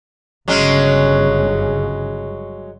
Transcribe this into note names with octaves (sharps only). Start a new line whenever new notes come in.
G1 C#3 F#3 G#3 C#4